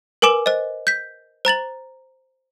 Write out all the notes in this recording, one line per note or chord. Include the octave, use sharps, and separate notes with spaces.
A#4 B4 G#5 D6 E7 F#7
C5 D#5
G6 B6
C5 A#5 A6 F#7